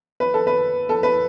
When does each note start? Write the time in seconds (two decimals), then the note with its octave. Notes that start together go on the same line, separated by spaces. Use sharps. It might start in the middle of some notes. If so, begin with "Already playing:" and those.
0.20 B4
0.34 A4
0.47 B4
0.89 A4
1.03 B4